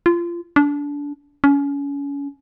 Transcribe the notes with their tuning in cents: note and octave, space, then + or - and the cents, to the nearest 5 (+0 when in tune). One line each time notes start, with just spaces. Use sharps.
F4 -25
D4 -25
C#4 +30